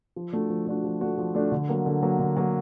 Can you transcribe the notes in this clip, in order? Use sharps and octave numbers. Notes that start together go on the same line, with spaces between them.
F3
A3 D4 F#4
F3
A3 D4 F#4
F3
A3 D4 F#4
F3
A3 D4 F#4
D3
F#3 A#3
D3
F#3 A#3
D3
F#3 A#3